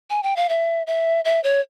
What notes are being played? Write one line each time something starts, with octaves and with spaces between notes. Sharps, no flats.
G#5
G5
F5
E5
E5
E5
C#5